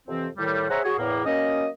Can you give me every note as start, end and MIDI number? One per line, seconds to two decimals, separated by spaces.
0.08 0.28 41
0.08 0.28 48
0.08 0.28 52
0.08 0.28 60
0.37 0.66 45
0.37 0.66 51
0.37 0.66 55
0.70 0.79 68
0.70 0.79 72
0.70 0.79 73
0.70 0.79 76
0.70 0.79 78
0.70 0.79 82
0.84 0.98 66
0.84 0.98 68
0.84 0.98 73
0.99 1.22 40
0.99 1.22 45
0.99 1.22 58
1.26 1.67 54
1.26 1.67 58
1.26 1.67 61
1.26 1.67 75